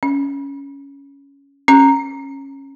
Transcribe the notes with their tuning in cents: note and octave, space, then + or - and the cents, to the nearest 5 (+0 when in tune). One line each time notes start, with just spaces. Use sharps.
C#4 +10
C#4 -20